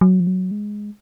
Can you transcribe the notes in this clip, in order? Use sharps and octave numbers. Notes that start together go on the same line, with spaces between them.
F#3
F3
F#3
G#3